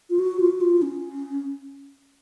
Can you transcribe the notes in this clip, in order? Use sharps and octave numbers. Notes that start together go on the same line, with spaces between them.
F4
F#4
F4
F#4
F4
C#4